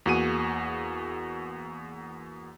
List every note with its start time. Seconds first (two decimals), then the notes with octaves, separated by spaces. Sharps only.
0.06 E2 A#3 F#4 G#4 D#7